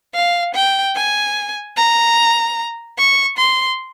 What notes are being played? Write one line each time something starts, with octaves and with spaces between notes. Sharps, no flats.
F5
G5
G#5
A#5
C#6
C6